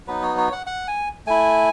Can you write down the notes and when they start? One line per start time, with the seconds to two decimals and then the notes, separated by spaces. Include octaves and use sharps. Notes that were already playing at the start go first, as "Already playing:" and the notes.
0.07 F#3 B3 D#4 B4
0.23 C#5
0.37 C#5
0.52 F#5
0.66 F#5
0.88 G#5
1.27 A3 E4 G#5